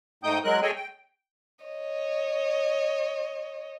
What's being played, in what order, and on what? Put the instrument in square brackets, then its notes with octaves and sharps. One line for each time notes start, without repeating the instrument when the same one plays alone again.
[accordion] G#2 A3 D#4 G5 D#6 G6
F#3 G#3 A#4 F#6
G#4 A4 C#5 D#5 G5 G#5
G5
[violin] C#5 D#5